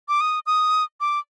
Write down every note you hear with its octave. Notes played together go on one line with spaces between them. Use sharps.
D6
D#6
D#6
D6